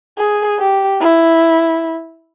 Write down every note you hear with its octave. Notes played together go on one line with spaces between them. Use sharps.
G#4
G4
E4